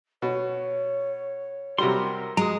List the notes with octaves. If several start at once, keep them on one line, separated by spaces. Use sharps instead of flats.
B2 C#5
C3 F#3 G3 A#4 C6
G#3 F#4 A#5 D#6